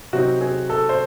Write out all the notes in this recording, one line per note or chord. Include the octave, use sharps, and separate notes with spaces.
C3 F#3 C4 D#4 F#4
G#4
A4
C5